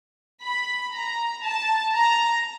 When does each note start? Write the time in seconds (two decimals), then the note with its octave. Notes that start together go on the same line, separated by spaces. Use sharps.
0.43 B5
0.93 A#5
1.44 A5
1.94 A#5